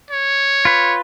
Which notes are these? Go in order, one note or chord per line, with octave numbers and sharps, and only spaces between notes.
C#5
F4 B4